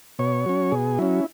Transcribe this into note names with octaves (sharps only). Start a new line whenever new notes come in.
B2 C#5
F#3 C#4
B2 G#4
F#3 C#4 E4